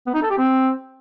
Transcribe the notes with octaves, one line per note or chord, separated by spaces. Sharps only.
B3
D#4
A4
G4
C4